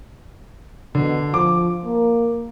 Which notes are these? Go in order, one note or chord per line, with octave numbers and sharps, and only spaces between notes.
B2 D3
F3 D6
A#3